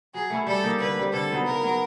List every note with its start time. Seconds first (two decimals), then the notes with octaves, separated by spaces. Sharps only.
0.14 F#3 G#4
0.30 A3 C#4 E4
0.47 G3 A4
0.63 A#3 D#4 G4
0.80 D3 B4
0.96 G3 C4
1.13 D3 A4
1.31 F#3 B3 D#4
1.46 C#3 A#4
1.63 F#3 B3